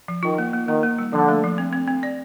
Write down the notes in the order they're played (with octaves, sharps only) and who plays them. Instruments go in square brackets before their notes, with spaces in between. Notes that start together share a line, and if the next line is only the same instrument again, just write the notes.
[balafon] F3
[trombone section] D#3 [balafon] F4
[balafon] A#3
A#3
[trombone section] D#3 [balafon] A#3
[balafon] A#3
G3
[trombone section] D3 [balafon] F3
[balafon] A3
F3
C4
C4
C4
D5